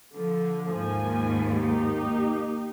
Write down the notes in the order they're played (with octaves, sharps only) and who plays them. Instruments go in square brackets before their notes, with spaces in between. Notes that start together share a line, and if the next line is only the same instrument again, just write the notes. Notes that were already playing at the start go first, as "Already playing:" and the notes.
[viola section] D3 [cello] F3
[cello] D#2 G#2 [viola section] F3 A#3 G#5
[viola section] A#3 D#4 G4